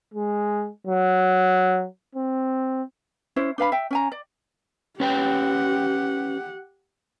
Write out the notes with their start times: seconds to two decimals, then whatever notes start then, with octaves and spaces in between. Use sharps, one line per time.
0.14 G#3
0.87 F#3
2.15 C4
3.36 C#4 E4 C5
3.58 D4 B4 F5 B5
3.72 E5 G5
3.91 C#4 G#5 A#5
4.12 D5
5.00 C#4 G4 B4 F#5 G5